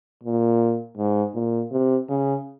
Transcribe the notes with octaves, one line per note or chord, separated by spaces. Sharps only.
A#2
G#2
A#2
C3
C#3